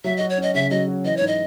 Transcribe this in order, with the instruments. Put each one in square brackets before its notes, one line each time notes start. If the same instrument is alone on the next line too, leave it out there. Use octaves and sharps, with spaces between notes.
[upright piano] F#3 [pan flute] E5
[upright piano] F#4 [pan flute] D#5
[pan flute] C#5
[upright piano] C#4 [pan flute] D#5
[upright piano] C#3 [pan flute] E5
[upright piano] F#3 [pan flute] D#5
[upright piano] F#4
[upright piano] E3 [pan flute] D#5
[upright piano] G#2 [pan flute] C#5
[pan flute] D#5